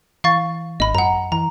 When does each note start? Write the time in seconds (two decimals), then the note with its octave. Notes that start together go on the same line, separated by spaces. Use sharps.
0.24 E3 F5 C#6 A6
0.80 G#1 D#5 B5
0.95 F#2 F#5 A#5
1.32 E3 A#5